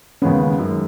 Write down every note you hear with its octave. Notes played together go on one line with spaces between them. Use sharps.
D#2 C#3 G#3 B3 C#4
F#2 D#3 G#3